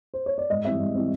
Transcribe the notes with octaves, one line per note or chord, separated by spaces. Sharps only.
C5
C#5
D5
G#2 D#5
E3 G3 C4 E5
G#2
E3 G3 C4